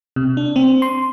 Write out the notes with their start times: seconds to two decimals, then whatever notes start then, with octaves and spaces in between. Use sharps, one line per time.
0.16 C3
0.37 D4
0.56 C4
0.82 C6